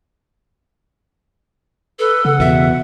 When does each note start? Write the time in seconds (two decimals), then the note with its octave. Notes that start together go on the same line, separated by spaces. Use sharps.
1.99 A4 B4
2.25 C#3 F#5
2.40 E2 B2 E5